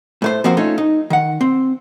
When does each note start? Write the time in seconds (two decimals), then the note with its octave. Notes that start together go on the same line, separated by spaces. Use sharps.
0.22 A2 A3 C5
0.44 F3 A#3 C4 F#4 C5
0.57 A3 C#4 D#4 F4 A4
0.78 D#4
1.10 D#3 F#5
1.41 C4